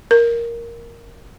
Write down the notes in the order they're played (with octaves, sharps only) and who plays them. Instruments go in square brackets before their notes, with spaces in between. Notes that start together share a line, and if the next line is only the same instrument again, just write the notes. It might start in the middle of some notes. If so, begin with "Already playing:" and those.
[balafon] A#4